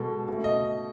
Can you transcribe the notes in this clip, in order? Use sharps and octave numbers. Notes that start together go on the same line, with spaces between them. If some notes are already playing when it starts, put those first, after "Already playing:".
Already playing: B2 G#3 A4
B2 A3
D#5